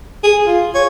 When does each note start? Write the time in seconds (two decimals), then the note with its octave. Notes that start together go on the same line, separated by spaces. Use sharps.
0.24 G#4
0.47 F4
0.75 C#5